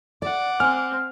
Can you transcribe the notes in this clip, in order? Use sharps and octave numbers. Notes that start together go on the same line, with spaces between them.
D5 F#5 D6
C4 G#5 F6